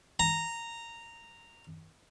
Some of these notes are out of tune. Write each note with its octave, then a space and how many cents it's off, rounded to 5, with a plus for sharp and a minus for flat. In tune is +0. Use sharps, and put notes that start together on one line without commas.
A#5 -10